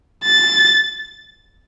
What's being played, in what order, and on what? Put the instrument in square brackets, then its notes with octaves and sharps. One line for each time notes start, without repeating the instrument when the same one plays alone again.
[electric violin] A6